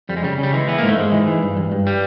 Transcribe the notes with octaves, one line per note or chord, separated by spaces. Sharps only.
F2 G3
G#3
C#3 G3
C#3 G3
E3 G#3
E3 B3
G#2 A#3
A3
G#2 G#3
E3
E3
G2
G2
G2
G3